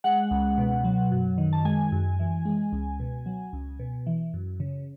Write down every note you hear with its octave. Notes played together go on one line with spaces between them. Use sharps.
G#3 F#5
C#2
B2
F#3
F#2
D#3
A5
G#3 G#5
F#2
E3
G#3
C#2
B2
F#3
C#2
B2
E3
F#2
C#3